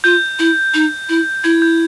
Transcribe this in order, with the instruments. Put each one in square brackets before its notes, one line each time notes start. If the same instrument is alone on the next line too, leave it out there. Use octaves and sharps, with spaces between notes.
[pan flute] F4 [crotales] G6
[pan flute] E4
D#4
E4
[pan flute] E4 [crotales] G#6
[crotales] G6